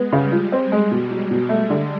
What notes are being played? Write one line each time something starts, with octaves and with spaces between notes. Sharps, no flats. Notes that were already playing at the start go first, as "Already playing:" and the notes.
Already playing: G#3 B3
C#3 G3
F3
C4
G#3
B2
F#3
B2
A3
D3